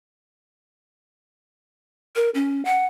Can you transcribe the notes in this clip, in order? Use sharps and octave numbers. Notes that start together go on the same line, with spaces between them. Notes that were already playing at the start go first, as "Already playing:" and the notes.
A#4
C#4
F#5